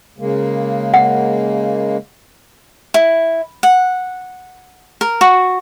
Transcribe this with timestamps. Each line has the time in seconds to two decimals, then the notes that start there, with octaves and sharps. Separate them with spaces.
0.19 C#3 G#3 A#3
0.94 F#5
2.94 E4
3.63 F#5
5.01 A#4
5.21 F#4